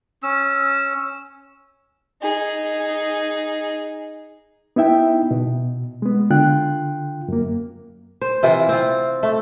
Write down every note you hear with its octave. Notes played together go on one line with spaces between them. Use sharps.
C#4 E6
D#4 G#4
B3 D#4 E4 E5 G5
B2
G#3 B3
D3 F4 G5 F#6
F#2 A#3
C5
C3 E3 F4
C4 F4
A3